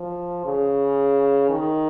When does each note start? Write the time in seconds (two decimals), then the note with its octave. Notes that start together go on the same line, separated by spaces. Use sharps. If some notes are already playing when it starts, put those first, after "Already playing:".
Already playing: F3
0.45 C#3
1.50 D#3